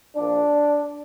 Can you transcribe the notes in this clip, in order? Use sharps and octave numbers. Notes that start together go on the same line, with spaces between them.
A#1 A#2 F3 D4